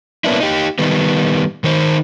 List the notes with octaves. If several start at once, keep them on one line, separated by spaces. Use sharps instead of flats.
A#3 B3 C#4 D4 E4
D#4 G4
D#3 G3 B3
D#3 D#4 C5